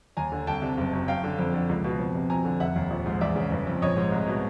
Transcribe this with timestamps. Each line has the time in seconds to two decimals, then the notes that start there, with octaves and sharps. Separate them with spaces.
0.17 D#2 G#5 A#5
0.32 D3
0.47 C2 G5 A5
0.62 C3
0.77 F#1
0.93 F#2
1.08 F#2 F5 G5
1.24 D3
1.39 F2
1.54 D3
1.69 C#2
1.84 B2
1.99 F2
2.15 C3
2.30 F2 G#5 A#5
2.45 D3
2.60 F1 E5 F#5
2.76 D#2
2.90 A#1
3.06 G#2
3.21 E2 D5 E5
3.36 C#3
3.52 G1
3.67 F2
3.82 A#1 C#5 D#5
3.97 G#2
4.12 C2
4.27 B2